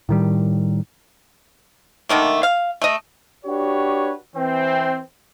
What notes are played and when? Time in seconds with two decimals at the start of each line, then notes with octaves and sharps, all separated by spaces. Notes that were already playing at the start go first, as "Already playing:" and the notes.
0.09 A2 D#3 G3
2.09 D3 D#3 A3 A#3
2.43 F5
2.82 A3 D#5
3.45 D4 F#4 G4 B4 C#5
4.34 E3 C4